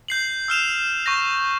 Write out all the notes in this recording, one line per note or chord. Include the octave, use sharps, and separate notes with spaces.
G6 C7 F#7
E6 F6 E7 F7
C#6 G6 A#6